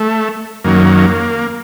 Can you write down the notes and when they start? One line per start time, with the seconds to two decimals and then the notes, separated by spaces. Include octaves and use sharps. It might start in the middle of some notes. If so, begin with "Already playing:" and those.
Already playing: A3
0.64 F#2 D#3 F#3 A#3